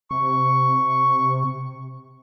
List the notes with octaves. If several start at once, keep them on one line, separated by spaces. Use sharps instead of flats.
C3 C#6